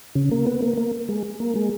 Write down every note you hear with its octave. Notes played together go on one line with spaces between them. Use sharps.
C#3
A#3
B3
A#3
A#3
G#3
A#3
G#3